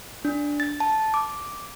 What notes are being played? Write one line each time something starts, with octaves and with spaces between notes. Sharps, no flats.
D4
A6
A5
D6